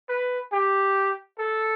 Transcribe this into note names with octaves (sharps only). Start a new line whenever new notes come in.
B4
G4
A4